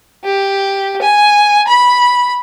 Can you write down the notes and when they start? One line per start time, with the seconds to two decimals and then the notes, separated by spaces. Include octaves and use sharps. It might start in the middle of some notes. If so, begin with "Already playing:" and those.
0.24 G4
1.02 G#5
1.67 B5